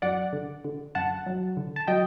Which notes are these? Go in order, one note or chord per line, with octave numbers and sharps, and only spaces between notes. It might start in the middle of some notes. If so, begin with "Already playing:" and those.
F#2 D5 F#5
D3
D3
F#2 F#5 A5
F#3
D3
A5
F#3 D#5 G5